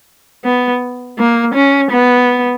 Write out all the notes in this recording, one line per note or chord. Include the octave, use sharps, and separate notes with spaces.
B3
A#3
C#4
B3